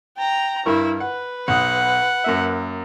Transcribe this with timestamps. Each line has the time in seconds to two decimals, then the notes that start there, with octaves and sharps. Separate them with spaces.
0.17 G5 A#5
0.65 G2 E4 A#4 C#6
1.00 B4 F#5
1.48 B1 F#5 D#6
2.24 F#2 A#3 E5